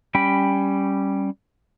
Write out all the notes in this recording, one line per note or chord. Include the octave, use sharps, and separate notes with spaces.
G3 C#4 G5 B5